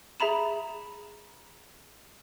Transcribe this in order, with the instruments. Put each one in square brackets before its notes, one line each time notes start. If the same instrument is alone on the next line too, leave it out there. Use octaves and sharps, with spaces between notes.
[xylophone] G#4 E5 A#5 B5 E7